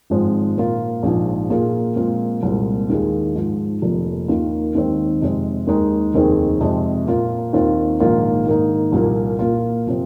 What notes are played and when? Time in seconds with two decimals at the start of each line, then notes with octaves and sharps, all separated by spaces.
0.10 G#1 G#2 F3 G#3 C4
0.57 A#2 A#3 F4
1.03 A#1 G#2 F3
1.50 A#2 A#3 F4 G#4
1.96 A#2 F3 G#3 C4 F4
2.43 C2 A#2 G#3 C4
2.90 D#2 D#3 G#3 F4 G#4
3.35 G#2 F3 G#3
3.82 F1 F2 F3 A#3
4.28 D#2 D#3 A#3 F4
4.75 D#2 D#3 G#3 C4
5.22 F2 C3 G#3 C4
5.67 D#2 D#3 G#3 D#4 G#4
6.14 F1 D#2 D#3 C4 G#4
6.60 F2 C3 G#3 C4
7.07 A#2 A#3 F4
7.53 D#2 D#3 C4 F4
8.00 A#1 G#2 D#3 A#3 F4
8.46 G#2 D#3 A#3 D#4
8.92 C2 A#2 F3 A#3
9.39 A#2 A#3 F4
9.87 C3 F3 C4